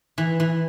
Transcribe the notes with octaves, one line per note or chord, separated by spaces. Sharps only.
E3
E3